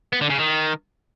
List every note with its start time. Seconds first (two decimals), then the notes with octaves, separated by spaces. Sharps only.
0.13 B3
0.21 D3
0.30 C#3
0.38 D#3